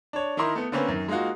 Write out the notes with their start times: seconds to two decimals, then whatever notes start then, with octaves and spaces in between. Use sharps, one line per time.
0.13 D4 C#5
0.37 D#3 D#4 E4 A#4 C6
0.55 A3 B3
0.72 D3 A#3 C4 C#4 B4
0.88 F#2 D#3
1.08 G#3 A#3 D#4 F4 F#4